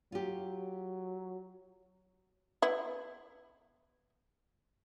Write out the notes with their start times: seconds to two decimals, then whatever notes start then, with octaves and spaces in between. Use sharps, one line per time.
0.12 F#3 F4 G4
2.62 B3 E4